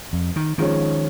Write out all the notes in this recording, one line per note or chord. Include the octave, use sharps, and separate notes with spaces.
F2
D#3
D#3 F3 G#3 C#4